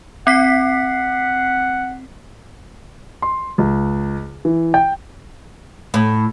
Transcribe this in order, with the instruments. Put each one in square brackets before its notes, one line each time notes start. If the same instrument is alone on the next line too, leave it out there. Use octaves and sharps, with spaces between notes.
[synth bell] C4 B6 C7 [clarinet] F#5
[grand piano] C6
C#2
E3
G5
[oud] A2